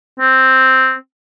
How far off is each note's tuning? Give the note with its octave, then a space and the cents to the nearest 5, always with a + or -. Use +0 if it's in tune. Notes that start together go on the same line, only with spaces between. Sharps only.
C4 +0